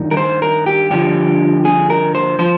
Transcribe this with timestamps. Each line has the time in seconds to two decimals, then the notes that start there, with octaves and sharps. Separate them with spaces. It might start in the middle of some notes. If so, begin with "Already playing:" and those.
Already playing: G2 D#3
0.11 A#4
0.17 C5
0.42 A#4
0.66 G4
0.90 G2 D3 F3 G4
1.65 G#4
1.90 A#4
2.15 C5
2.39 F3 C5